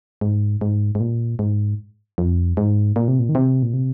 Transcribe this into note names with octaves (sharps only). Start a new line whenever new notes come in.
G#2
G#2
G#2
A#2
G#2
F2
G#2
A#2
C3
A#2
D#3
C3
A#2
C3